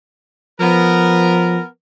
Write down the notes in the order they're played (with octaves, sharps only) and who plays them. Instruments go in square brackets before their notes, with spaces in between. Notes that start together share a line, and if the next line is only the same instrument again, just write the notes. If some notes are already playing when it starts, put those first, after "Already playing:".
[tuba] F3 [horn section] B3 A#4